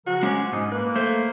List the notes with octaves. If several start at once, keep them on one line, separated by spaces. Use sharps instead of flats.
C#3 F3 F#4 A#4
G#3 C#4 C5 G#5 D6
G#2 D#4
A#3 B4
A3 C5